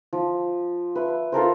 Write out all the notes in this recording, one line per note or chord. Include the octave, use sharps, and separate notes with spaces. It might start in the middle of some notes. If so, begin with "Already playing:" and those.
F3
B4 E5 C#6
F4 A4 A#4 C5